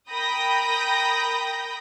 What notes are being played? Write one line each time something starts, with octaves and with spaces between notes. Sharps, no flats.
A#4 G5 B5 D#6 G6 A#6